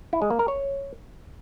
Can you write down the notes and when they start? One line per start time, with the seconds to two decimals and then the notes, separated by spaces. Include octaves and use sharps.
0.13 E4
0.22 G#3
0.30 A#3
0.39 A#4
0.48 C#5